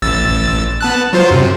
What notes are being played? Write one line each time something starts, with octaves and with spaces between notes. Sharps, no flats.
A1 E6 A6
B3 A5 F#6
F#3 F4 C5
F#2 C3